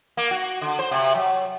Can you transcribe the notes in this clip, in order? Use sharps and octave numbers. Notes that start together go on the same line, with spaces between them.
A#3
F#4
D3
C5
C3
F#3